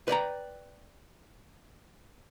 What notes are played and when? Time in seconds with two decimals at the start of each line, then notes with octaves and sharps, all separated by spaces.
0.08 B4 D5 G5 A#5